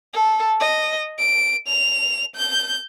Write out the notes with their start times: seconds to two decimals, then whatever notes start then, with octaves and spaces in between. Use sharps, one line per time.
0.13 A4
0.60 D#5
1.19 D7
1.68 F7
2.36 G6